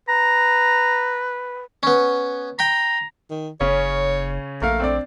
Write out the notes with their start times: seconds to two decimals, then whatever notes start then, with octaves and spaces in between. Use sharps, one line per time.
0.09 B4 A#5
1.83 B3 C#4
2.59 G5 A#5 B5
3.30 D#3
3.61 F#1 C#3 C#4 C#5
4.62 A#1 A3 A#3 A#4 F5
4.80 C4 D4 D5